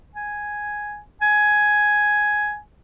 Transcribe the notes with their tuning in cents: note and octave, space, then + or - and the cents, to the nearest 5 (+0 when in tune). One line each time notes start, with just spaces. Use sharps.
G#5 +0
G#5 +10